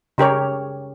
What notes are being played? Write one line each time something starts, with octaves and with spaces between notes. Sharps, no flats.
C#3 G4 A#4 C#5